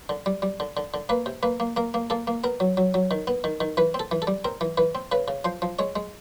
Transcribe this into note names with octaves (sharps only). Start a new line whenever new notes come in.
D3
G3
G3
D3
D3
D3
A#3 B4
C3
A#3 B4
A#3
A#3 A#4
A#3
A#3 A4
A#3
B3 A#4
F#3
F#3
F#3
D#3
B3
D#3
D#3
E3 B4
C4
A4
E3
A4
G3
C4 A#4
E3
E3 B4
C4
C#3 B4
C#3
F3 C5
F3
G#3 C#5
G#3